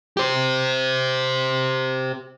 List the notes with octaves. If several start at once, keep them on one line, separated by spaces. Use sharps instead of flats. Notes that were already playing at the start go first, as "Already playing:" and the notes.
G4 C5